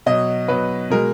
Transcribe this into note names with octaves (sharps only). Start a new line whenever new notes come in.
B2 F#3 D#5
B2 F#3 B4
B2 G#3 A#4